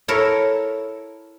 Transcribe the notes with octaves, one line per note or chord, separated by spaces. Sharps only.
E4 A4 A#4 C#5